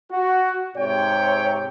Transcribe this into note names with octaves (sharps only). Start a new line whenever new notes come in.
F#4
G#2 C3 C#5 G5